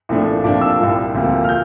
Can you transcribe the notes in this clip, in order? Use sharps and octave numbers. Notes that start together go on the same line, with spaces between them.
C2 A#2 F3 A3 D4
C3 F3 A#3 D4 D6
E6
C2 A#2 G3
D2 C3 F3 A#3
F6
G6